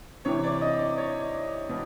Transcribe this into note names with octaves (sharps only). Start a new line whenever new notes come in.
C3 E3 C#5
D5
D#5
D5
C#5
B2